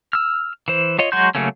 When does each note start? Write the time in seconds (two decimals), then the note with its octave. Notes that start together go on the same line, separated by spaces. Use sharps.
0.13 E6 F6
0.68 E3 C5
0.99 F4 C#5 D#5
1.12 F#3 G#3 F#4 C6 G6
1.35 C#3 F#3 A3 A#3 C#4